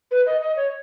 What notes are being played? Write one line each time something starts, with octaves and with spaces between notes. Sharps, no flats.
B4
D#5
D#5
C#5